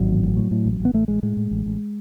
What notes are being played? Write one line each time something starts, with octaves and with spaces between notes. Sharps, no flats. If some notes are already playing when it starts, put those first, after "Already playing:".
Already playing: G#1 F#3
A1
A1
A2
A2
A1
A1
B3
A1 A3
A1 G#3
A2 G#3
A2
A1
A1